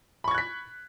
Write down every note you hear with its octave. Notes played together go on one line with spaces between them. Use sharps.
B5 C#6 F#6 G#6 B6